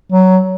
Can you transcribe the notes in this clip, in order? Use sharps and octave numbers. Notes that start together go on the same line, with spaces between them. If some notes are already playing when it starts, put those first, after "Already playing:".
F#3